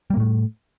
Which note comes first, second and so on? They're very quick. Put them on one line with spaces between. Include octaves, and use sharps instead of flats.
G3 A#3 A2 A3